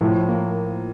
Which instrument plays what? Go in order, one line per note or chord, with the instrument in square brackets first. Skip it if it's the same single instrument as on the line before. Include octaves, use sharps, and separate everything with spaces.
[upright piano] A2 [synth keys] F3
[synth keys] A#3